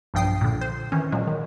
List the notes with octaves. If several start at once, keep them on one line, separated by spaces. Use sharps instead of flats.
B1 G2 F3 G5 D#6 C7
A#2 D3
C5
D#3 E3 C#4
A#2 F#3 G#3
D#3